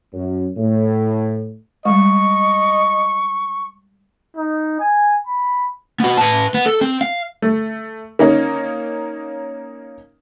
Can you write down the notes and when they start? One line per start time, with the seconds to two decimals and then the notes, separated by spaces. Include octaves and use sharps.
0.14 F#2
0.57 A2
1.85 G3 G#3 D#5 C#6
4.37 D#4
4.80 G#5
5.27 B5
6.00 B3 F#4
6.17 B4 A5
6.54 B3
6.66 A4
6.81 C4
7.01 F5
7.42 A3
8.19 A#3 C#4 D#4